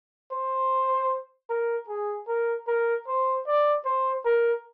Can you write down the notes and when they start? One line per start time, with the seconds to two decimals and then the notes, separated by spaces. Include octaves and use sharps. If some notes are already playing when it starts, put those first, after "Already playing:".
0.32 C5
1.50 A#4
1.89 G#4
2.28 A#4
2.68 A#4
3.08 C5
3.47 D5
3.85 C5
4.25 A#4